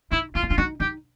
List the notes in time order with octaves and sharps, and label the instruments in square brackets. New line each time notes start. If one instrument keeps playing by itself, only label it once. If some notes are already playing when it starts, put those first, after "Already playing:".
[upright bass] D#4 [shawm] E4
[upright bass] E4 [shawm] F4
[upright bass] C#4
[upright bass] D4 [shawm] F4
[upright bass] D#4 [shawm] F#4
[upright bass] D#4 [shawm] G4